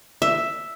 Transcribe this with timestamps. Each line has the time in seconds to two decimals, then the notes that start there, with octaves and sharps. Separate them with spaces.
0.22 E5